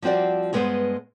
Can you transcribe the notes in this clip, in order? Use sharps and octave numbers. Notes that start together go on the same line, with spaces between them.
F3 G3 C4 F#4 D5
G2 G#3 B3 G4 B4 C5